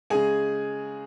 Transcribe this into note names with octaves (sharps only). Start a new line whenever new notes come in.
C#3 G#3 G#4 G#5